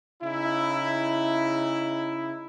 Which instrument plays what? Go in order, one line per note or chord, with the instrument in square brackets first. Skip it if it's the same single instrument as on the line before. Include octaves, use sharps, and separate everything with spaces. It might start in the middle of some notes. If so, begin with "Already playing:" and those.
[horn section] C#3 D#4 E4